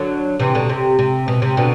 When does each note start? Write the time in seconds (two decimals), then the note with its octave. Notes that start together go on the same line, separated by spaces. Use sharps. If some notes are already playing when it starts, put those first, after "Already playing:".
Already playing: D3 F#3
0.40 C3 E3
0.55 B2 D3
0.69 C3
0.99 C3
1.28 B2
1.42 C3
1.57 B2 D3